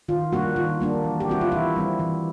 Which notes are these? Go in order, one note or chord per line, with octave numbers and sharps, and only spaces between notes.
D#3 F4
G3 A#3 D4 F#4
D#3 F4
G3 A#3 D4
E3
G4
G3 C4 E4 F#4
F4
E3 E4
G3 C4 E4
E3